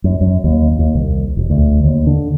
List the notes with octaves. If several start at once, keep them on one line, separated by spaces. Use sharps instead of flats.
F#2
F#2
D#2
D#2
C2
E1
D2
D#2
D3